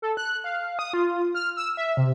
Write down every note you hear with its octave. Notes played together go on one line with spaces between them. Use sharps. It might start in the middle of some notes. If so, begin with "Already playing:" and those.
A4
F#6
F5
D#6
F4
F6
E6
E5
C3